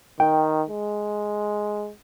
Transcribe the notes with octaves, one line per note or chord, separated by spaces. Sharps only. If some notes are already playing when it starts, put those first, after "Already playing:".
D#3 G5
G#3